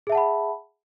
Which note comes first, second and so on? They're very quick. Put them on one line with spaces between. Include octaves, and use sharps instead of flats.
G#4 E5 A5 F#5 B5